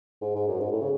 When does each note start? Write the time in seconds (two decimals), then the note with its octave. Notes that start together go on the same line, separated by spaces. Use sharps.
0.22 G#2
0.35 G#2
0.48 F#2
0.61 G#2
0.71 A2
0.81 C#3